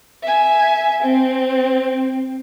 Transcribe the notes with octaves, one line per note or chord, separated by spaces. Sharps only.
E5 G#5
C4